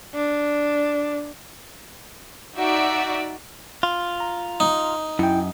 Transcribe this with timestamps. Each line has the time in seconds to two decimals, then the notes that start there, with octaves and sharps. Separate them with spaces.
0.15 D4
2.55 D#4 F#4 D5 E5 D6
3.83 F4
4.20 A#5
4.60 D#4
5.19 F#2 E4 G5